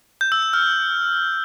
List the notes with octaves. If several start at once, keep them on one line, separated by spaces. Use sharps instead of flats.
G6
E6
E6
F6